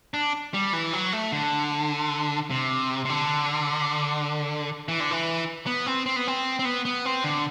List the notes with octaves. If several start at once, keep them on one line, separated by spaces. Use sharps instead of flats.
D4
G3
E3
F#3
A3
D3
C3
C3
D3
E3
D3
E3
B3
C4
C4
B3
C4
C4
B3
B3
C4
D3